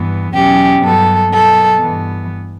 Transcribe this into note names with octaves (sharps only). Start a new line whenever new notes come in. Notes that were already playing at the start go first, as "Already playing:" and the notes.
Already playing: G2 E3 B3
E2 B2 F#3 C#4 G4
G2 F#3 B3 A4
B2 F#3 B3 A4
G2 E3 B3